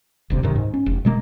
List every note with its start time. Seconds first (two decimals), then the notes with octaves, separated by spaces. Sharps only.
0.30 E1 D2 C3
0.43 C#2 F#2 C3 D#3
0.56 G#2
0.74 C#4
0.86 F1
1.05 B2 G#3 A#3